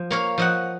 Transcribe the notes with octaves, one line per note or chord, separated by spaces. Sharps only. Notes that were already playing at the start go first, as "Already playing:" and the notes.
Already playing: F3
A#3 C#5 F5
F3 D#5 F#5